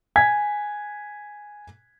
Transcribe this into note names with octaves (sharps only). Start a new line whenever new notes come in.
G#5 G#6 B6